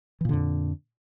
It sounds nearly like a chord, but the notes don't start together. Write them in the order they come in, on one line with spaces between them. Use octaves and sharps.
E3 A#2 D3 F2